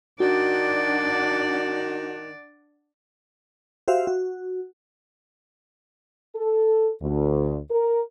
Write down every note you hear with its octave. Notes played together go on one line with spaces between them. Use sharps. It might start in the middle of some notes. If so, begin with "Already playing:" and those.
D#3 D4 F#4 D5 F#5
F#4 G4 C5 E5 F5
F#4
A4
D2
A#4